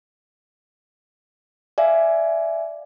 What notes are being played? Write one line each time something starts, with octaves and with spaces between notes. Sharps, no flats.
D5 E5 F5 G#5